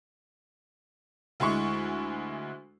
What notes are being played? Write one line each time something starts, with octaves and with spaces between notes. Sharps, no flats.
D2 G#3 E4 C#6